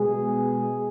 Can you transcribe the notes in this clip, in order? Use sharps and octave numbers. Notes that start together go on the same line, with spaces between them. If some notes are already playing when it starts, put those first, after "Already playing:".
Already playing: B2 G#3 B3 G#4